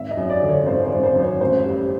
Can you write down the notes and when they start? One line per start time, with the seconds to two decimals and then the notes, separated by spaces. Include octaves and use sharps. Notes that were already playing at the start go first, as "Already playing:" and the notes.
Already playing: G#1 E5
0.11 D#5
0.17 F#2
0.29 D5
0.43 D3
0.49 C#5
0.66 G#1 C5
0.86 C5
0.92 G#1
1.03 C5
1.16 F#2
1.23 C#5
1.41 A1 C5
1.65 G2